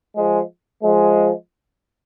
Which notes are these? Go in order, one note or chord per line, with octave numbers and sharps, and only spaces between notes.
F3 G#3
F3 G#3